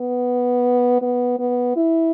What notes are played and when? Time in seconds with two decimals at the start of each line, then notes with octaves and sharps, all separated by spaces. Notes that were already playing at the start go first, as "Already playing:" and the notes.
Already playing: B3
1.02 B3
1.39 B3
1.77 E4